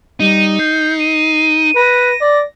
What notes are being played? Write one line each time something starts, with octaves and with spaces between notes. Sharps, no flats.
G3 D#4 D#7
G6 C7
D#7
B4 A#6
D5